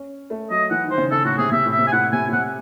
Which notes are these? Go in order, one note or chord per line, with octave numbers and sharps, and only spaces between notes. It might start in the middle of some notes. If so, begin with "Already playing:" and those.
Already playing: C#4
A3
F#3 D#5
E3 F#5
D#3
C5
C#3
C#3 A4
A2 F#4
C3 G#4
C3 E5
A2
E5
C3
G#5
A2 F#5
C3 G#5
A2
C3 F#5